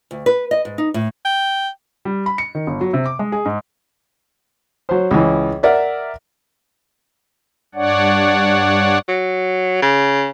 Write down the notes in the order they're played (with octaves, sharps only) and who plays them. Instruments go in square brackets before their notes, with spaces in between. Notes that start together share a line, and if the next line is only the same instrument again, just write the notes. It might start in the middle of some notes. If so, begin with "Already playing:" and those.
[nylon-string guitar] D2
B4
D#5
G#2
D#4
A2
[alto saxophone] G5
[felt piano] G3
B5
C#7
D#3
G1
F#3
C3
D6
G#3
G#4
G#2
[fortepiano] F#3 C5
C#2 E3
A#4 D5 E5 F#5
[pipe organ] G2 D4 C#5 D5 F#5
[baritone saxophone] F#3
C#3